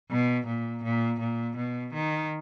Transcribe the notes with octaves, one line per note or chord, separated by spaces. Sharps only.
B2
A#2
A#2
A#2
B2
D#3